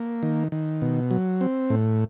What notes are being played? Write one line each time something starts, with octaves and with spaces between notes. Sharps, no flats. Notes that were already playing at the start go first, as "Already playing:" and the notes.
Already playing: A#3
D#3
D#3
B2
F#3
C4
A2